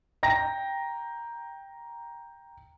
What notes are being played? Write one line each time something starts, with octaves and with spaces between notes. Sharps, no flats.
G5 A#5 A#6